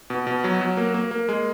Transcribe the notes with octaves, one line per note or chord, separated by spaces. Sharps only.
B2
B2
F#3
F#3
A#3
A#3
A#3
G#3